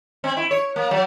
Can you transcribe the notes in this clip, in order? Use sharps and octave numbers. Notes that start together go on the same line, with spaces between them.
C4
E4
C#5
A#3
F#3